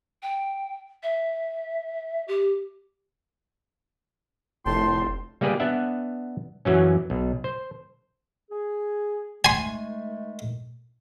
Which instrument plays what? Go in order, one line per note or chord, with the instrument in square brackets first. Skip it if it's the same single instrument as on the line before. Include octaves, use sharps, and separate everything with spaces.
[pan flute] G5
E5
G4
[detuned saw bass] F1 [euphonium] A2 [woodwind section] G5 A5 C6
[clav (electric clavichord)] G3 A#3 G4 G#4 B4 D5
B3 D4 E5 F#5
F#2 E3 F#3 C#4
B1
C5
[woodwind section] G#4
[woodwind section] D#3 G#3 A3 [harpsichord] G#5 C6